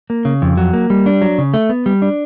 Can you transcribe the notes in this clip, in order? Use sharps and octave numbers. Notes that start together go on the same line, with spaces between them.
A#3
C#3
F2
F#3
A#3
G3
D4
F#3
C#3
A3
B3
G3
D4